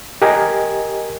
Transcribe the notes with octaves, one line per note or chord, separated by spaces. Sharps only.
G4 A#4 D#5 G#5